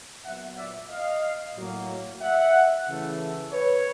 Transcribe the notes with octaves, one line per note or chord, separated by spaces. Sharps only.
A#2 F#3 B3 E5 F#5
D5 E5
D#5 F5
A2 F#3 A#3
E5 F#5
C#3 E3 A3
B4 C#5